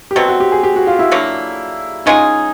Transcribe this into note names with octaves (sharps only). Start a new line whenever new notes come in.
G4
B2 F#3 A3 C4 F#4
F#4
G4
G#4
G4
F#4
F4
E4
D3 F#3 A#3
G#3 C#4 D#4 F4 G#4